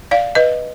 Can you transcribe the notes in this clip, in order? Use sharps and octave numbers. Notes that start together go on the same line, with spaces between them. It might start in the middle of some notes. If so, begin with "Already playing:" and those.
D5 F5
B4 D#5